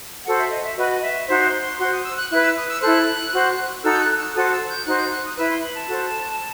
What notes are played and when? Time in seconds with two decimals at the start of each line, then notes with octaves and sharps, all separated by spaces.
0.26 F#4 A4 C5 F#5
0.38 E5
0.51 D#5
0.64 E5
0.77 F#4 B4 D#5
1.02 E5
1.28 D#4 F#4 C5 E5
1.45 C6
1.62 C6
1.78 F#4 C5 C6
1.91 D#6
2.04 E6
2.17 F#6
2.30 E4 B4 F#6
2.43 E6
2.56 D#6
2.68 E6
2.81 E4 A4 C5 F#6
3.31 F#4 C5
3.83 D#4 F#4 A4 E6
3.93 G6
4.01 F#6
4.17 E6
4.34 F#4 A4 C5 D#6
4.52 E6
4.69 G6
4.85 D#4 F#4 C5 F#6
4.98 G6
5.11 F#6
5.24 D#6
5.36 E4 B4 E6
5.49 C6
5.62 B5
5.75 A5
5.87 F#4 A4 C5